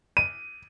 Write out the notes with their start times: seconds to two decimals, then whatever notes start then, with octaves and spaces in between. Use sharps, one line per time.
0.17 D#7